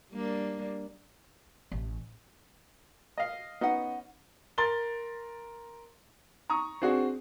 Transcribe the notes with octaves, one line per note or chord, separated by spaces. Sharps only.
G3 A#3 D4
A1
D#5 F5
B3 C#4 D#4 F#5
A#4 C6 A6 G7
A#5 C#6 D#6
C4 D4 F#4 G#4